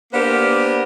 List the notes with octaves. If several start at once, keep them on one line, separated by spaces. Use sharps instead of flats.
A#3 B3 D4 G4 A#4 C5